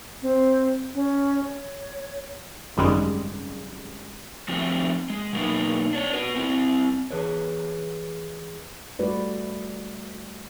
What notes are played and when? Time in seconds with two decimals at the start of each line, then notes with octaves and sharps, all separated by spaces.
0.22 C4
0.94 C#4
1.44 C#5
2.77 G#1 F#2 C#3 G3 G#3
4.48 F3 A3 C4 F#4 G4
5.10 G#3
5.33 B2 F#3 A#3 D#4 B4
5.93 D4 C#5
6.13 F#4 B4
6.36 C4 E4
7.10 E3 G#4 B4 C#5
8.99 G3 A3 F#4 B4 D5